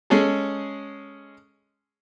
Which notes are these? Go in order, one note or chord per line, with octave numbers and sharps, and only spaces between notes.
G#3 C#4 G#4 A4